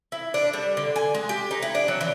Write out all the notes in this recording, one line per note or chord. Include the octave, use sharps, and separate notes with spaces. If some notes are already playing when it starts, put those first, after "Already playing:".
E4
D4
G3
D3
G#5
G#3
G4
D#4
E4
D4
F#3
E3